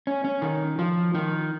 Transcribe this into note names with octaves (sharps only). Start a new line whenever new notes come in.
C#4
C#4
D#3
F3
D#3